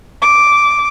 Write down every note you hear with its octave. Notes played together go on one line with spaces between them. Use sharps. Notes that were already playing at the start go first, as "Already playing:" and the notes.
D6